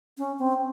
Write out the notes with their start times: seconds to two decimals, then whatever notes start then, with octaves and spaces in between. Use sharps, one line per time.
0.18 C#4
0.39 C4